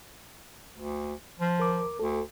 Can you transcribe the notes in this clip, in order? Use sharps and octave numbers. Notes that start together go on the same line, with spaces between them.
D2
F3
D#2 A#4 D6
D2 A4